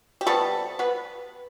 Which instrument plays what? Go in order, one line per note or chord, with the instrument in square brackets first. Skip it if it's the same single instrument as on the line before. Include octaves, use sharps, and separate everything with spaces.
[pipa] G4
C3 G3 A3 B3 A4
B3 B4